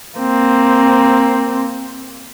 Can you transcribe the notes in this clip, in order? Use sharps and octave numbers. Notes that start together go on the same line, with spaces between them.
A#3 C4